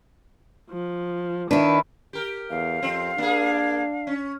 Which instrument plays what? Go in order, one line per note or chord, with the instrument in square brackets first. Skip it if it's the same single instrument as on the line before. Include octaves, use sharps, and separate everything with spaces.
[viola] F3
[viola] D#3 [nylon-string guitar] D4 [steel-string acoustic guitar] E4 B4
[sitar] G4 A#4
[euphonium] E2 [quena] F5
[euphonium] F2 [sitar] C4
[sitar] A#3 G#4 [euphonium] D4
[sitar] C#4